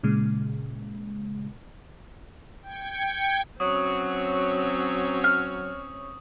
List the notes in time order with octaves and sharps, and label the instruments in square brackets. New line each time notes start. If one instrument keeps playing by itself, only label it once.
[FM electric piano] A#2 C#3 G#3
[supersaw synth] G5 G#6 C#7
[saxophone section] F#3 [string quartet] C4 C#4 C#5 [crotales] C#6 D#6
[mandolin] F6